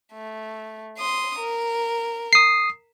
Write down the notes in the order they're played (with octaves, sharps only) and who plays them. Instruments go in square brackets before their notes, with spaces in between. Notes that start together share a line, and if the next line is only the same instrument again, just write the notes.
[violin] A3
C6 D#6
A#4
[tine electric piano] D#6 C7